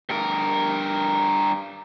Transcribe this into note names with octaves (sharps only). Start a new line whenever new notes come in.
G2 A#4